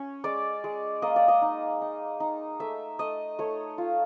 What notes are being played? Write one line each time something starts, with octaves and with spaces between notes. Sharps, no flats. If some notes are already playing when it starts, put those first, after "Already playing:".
Already playing: C#4 C#5
G#3 D5
G#3
A#3 D#5
D5
D#5
D#4
D#4
D#4
A3 E5
A3 D#5
A3 C#5
F4